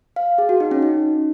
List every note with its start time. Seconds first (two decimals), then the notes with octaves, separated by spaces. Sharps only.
0.16 F5
0.38 G#4
0.49 F#4
0.60 D#4
0.71 C#4
0.82 D#4